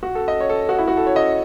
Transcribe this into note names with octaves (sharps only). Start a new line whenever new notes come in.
F#4
A4
D#5
C#5
A4
F#4
E4
F#4
A4
C#5
D#5